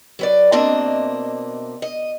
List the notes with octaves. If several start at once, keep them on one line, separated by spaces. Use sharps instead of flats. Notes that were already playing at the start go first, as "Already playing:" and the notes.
F#3 B4 D5
B2 A#3 C4 D4 D#5 E5
D#5